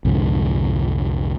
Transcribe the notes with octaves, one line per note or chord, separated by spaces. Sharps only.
C2 F2 G#2 D3